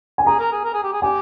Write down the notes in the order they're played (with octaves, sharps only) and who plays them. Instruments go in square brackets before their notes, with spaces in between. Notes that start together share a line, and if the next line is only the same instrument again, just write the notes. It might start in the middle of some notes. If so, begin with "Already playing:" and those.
[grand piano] G#5
[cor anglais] G#4 [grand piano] A#5
[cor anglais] A#4
G#4
A#4
G#4
G4
G#4
[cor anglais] G4 [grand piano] G#5